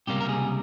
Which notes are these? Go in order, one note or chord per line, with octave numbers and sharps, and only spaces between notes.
C#2 C3 G3 A#3 G4
A#4
G#4